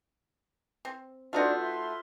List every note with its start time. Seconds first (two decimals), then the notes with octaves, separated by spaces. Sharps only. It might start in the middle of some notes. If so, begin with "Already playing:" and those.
0.85 C4
1.33 A3 D4 D#4 F4 F#4 B4 C5
1.61 E5 C6